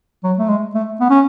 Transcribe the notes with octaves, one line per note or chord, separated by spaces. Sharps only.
F#3
A3
G#3
A3
B3
C#4